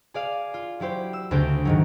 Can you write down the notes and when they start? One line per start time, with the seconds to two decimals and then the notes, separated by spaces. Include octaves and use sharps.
0.14 G#4 D5 F5
0.54 F4
0.80 F#3 E4 G4 C5
1.13 E6
1.31 D2 C#3 C4 G4 G6 D7
1.65 G#2 D#3 F#3